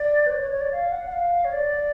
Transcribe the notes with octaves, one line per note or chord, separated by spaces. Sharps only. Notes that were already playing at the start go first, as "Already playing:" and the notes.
Already playing: D5
B4
C#5
C#5
C#5
D5
F5
F#5
F#5
F5
C#5
D5